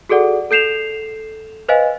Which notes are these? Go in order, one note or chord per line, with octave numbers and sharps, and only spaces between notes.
F#4 G#4 A4 D5 F#5
A4 G6 C7 E7 F7
B4 C5 D#5 F5 G#5